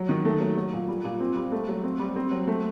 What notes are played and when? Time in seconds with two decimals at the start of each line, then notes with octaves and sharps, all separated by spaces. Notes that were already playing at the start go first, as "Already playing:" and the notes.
Already playing: F#3
0.09 D#3
0.25 A3
0.40 F#3
0.56 F#3
0.73 A#2
0.88 G3
1.04 A#2
1.20 C4
1.36 G3
1.52 A3
1.68 F#3
1.83 C4
1.99 G3
2.16 C4
2.31 F#3
2.47 A3